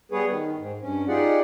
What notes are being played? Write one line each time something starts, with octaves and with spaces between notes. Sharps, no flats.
G3 B3 G#4 B4 C#5
D#3
G#2
G2 C#4
D#4 F4 G4 G#4 D5 F#5